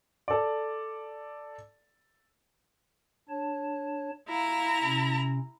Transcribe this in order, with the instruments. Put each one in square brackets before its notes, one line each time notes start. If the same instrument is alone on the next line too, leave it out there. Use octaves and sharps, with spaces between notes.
[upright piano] A4 D5
[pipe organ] D4 C#5 A5
[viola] E4 A#5 [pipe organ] F5
[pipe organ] C3 C#4